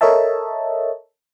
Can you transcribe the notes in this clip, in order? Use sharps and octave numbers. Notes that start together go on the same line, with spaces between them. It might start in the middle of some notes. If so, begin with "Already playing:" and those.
A4 A#4 C#5 D#5 E5 A5